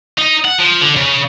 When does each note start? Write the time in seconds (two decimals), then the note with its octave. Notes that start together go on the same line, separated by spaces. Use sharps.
0.18 D#4
0.44 F#5
0.58 F3
0.81 D3
0.97 C#3